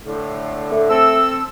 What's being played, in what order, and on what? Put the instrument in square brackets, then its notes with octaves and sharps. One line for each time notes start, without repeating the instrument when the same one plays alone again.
[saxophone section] A2 D3
[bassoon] A3
[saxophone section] C4 A4 [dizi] E6